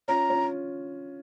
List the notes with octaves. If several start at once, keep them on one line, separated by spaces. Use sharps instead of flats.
C#4 F4 A#5
C#4 F4